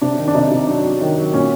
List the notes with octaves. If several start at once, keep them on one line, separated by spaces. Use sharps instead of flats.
C3 D4
D#3
D4
C3 D#4
C3
F#3 D4
F#3
D#3
F#3
A#2 C#4